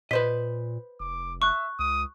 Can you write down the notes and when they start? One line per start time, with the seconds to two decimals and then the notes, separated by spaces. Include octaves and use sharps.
0.11 A#2 B4 C5 D#5 B6
1.00 F1 D6
1.42 E5 C#6 F#6
1.79 C#2 D#6